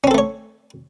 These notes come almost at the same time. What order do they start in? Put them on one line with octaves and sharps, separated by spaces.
C#4 C4 A4 A3 C#5